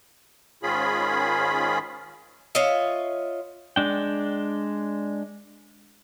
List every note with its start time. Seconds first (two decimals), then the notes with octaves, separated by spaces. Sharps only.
0.63 G#2 D#3 C#4 F4 G#4 B5
2.55 F4 C#5 D#5 E5
3.76 G#3 D4 G5